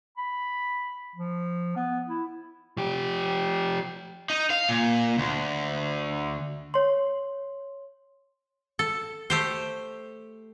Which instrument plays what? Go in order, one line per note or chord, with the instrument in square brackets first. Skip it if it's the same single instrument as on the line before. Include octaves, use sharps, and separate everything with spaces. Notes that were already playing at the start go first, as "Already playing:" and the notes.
[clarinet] B5
F3
B3
E4
[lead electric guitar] F3 G4
[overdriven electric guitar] D#4
F5
A#2
D2
[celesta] C#5 C6
[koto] A4
A3 G4 C5